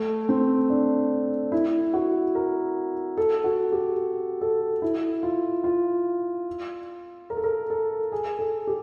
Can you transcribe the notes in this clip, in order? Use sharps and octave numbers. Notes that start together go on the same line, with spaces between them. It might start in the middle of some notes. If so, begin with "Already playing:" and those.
Already playing: A3
C4
D4
E4
F#4
A#4
A4
F#4
G4
A4
E4
F4
F4
A#4
A4
A#4
A4
G#4
A4
G4